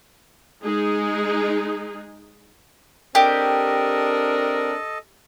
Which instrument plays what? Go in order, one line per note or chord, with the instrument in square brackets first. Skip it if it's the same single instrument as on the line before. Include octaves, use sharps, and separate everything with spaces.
[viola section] G#3 D#4 G#4
[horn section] C4 D4 A#4 [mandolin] G4 [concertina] A4 D#5